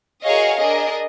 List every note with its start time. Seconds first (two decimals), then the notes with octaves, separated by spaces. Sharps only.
0.24 F#4 G#4 A#4 C#5 D#5 F5
0.57 D4 G#4 A#4 D#5